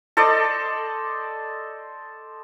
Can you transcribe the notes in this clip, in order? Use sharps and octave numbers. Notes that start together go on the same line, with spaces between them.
A4 C5 D5 D#5